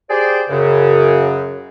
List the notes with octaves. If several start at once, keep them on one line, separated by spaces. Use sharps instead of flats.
G4 G#4 C5 D5
F#2 C#3